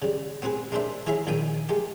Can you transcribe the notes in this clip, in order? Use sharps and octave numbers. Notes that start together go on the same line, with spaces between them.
C#3 G3
B3 C4 F#4 G#4 B4
G#3 A#3 D4 A4 C5 E5
E3 G#4 C#5 E5 F5 B5
A#1 D#3 G5 G#5 D#6
G#3 A3 G4